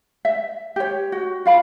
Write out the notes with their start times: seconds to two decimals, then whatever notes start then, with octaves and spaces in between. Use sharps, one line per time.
0.25 E5
0.76 G4 C#5
1.12 F#4
1.46 F4 F5 B5